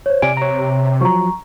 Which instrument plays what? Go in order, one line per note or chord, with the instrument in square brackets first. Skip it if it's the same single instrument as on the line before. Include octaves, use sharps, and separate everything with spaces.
[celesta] C5 C#5
[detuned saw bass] C3 [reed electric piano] D5 G#5 [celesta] D7
[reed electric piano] C#5 A#5
[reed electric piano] F3 F#3 [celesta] A#5 C#6